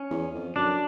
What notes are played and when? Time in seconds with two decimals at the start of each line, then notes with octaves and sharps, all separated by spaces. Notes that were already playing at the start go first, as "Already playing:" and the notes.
Already playing: C#4
0.10 E2
0.34 F2
0.56 F#2 D4